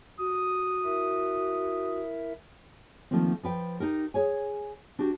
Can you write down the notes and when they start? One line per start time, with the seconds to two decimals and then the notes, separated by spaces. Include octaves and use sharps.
0.19 F#4 D#6
0.84 E4 A#4 E5
3.11 D#3 F3 A3 A#3 C4
3.43 F3 B4 G5
3.80 D#4 G4 A#4
4.14 G#4 C#5 G#5
4.99 D4 F#4 G4